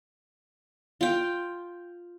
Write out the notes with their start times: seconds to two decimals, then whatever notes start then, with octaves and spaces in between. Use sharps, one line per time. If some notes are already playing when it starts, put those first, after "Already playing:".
1.01 F4 G5